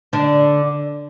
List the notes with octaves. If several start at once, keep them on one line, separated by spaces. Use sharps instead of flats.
D3 D4